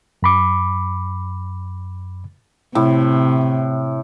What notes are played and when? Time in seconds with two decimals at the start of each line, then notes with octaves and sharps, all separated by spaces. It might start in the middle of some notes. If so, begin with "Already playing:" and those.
0.23 F#2 B5 D6
2.75 A2 C3